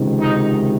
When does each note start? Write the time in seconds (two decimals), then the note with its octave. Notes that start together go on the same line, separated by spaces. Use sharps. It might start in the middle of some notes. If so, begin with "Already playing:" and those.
Already playing: C#2 C3 D#3
0.20 D#4 D#5